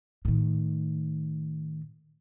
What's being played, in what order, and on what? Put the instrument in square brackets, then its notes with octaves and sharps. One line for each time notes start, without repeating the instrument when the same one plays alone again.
[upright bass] A2 D#3